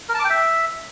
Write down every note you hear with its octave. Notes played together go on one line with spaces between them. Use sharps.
A#4
A5
D6
G5
E5